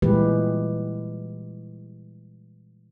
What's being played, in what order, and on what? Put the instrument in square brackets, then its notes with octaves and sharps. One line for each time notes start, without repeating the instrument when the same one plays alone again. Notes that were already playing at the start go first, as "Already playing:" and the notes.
[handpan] A#2 E3 G3 G#3 G4 B4